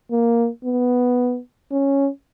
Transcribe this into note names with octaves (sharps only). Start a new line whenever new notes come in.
A#3
B3
C#4